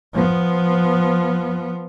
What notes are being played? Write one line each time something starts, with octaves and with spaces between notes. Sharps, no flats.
F3 B3